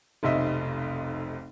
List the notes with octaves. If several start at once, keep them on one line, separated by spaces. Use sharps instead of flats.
F1 B1 C3 D#5 E5